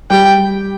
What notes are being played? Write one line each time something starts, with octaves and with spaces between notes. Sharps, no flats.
G3 G4 G5